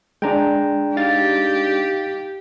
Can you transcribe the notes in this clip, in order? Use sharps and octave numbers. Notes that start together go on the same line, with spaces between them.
G#3 D4 G5 A#5
D#4 G4 F5 A6